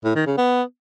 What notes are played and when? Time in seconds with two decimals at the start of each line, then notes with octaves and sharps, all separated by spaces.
0.04 A2
0.15 D#3
0.26 C#3
0.37 B3